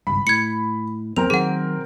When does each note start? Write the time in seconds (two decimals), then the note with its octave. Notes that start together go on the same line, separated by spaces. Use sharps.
0.07 G#1 C#2 G2 B5
0.27 A2 G#6 C#7
1.16 E2 F#3 B3 C4 A#4 F7
1.30 B2 D#3 F#3 G#4 F#5